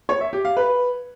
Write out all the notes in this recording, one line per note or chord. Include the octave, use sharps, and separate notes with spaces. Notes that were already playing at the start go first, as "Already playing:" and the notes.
C#5
E5
G4
F5
B4